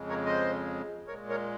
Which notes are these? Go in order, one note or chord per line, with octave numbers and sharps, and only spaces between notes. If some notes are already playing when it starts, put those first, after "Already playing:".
Already playing: F2 C#3 G#3
A#4 C#5
C5 D#5
A#2 G#3 A#4 C#5
A#4 C#5